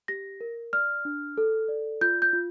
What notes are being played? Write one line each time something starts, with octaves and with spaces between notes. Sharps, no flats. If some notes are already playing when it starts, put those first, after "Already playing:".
G4 A#6
A#4
D5 F6
D4
A4
D5
F4 G6
G6
F4